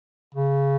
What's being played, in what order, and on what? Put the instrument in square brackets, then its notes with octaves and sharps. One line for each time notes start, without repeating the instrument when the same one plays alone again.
[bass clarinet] C#3